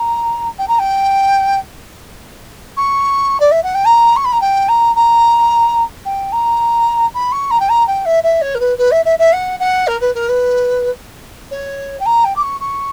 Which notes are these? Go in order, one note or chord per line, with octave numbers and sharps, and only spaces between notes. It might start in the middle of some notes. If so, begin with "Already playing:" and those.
Already playing: A#5
G5
A#5
G5
C#6
D5
E5
F#5
G5
A#5
C#6
B5
A#5
G5
A#5
A#5
G5
A#5
B5
C#6
A#5
G5
A#5
G5
E5
E5
C#5
A#4
B4
B4
E5
E5
E5
F#5
F#5
A#4
B4
A#4
B4
C#5
G5
A#5
G5
D6
C#6
C#6